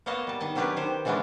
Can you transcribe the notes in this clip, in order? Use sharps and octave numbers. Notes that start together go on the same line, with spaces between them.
A#3 B3 C#5 D#5 F5 A5
G3 A5
D#3 D#5 A5
F#3 C#4 D4 G4 G#4 B4
D#3 G4 C5
C#3 E3 G#3 B3 C#4 D4